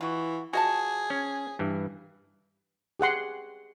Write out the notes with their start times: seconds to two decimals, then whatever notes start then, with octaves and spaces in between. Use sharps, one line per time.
0.01 E3 F4 F#4
0.53 F3 F#4 G#4 D#5 A5
1.10 C#4
1.59 G2 E3
3.00 G4 G#4 F#5 C6